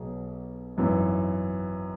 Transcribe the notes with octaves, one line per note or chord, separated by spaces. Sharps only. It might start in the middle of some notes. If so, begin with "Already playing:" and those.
Already playing: B1 B2 G#4
G#1 F#2 E3